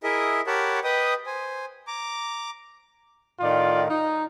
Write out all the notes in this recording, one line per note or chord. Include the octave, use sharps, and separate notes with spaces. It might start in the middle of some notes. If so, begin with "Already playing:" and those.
E4 G#4 A#4 D#5 E5
G4 A#4 C#5 F#5 A5 B5
B4 D#5 G5 D#6
C5 G#5
A#5 D6
A2 D#3 F4 D5
D#4